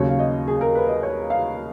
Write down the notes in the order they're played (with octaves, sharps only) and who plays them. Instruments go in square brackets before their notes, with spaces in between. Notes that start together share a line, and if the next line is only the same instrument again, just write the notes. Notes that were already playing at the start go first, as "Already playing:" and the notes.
Already playing: [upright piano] D#2 C#3 F#3 C#5
F5
D#5
G#4
A#4
B4
D#5
C#5
F5